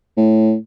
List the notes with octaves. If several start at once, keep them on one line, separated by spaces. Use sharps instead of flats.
A2